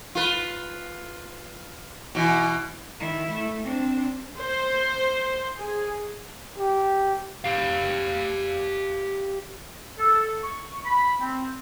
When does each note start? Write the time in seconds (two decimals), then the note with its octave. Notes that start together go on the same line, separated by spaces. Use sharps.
0.15 F4 B4
2.15 B2 E3
3.00 D#3 E4
3.32 A3
3.65 C4 D4
4.39 C5
5.56 G#4
6.58 G4
7.44 G4 F5
9.98 A4
10.43 C#6
10.85 B5
11.20 C4